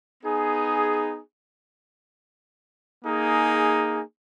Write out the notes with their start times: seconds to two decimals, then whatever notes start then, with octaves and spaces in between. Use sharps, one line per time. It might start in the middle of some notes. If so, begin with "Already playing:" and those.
0.23 B3 D#4 G#4
3.04 A#3 D#4 G#4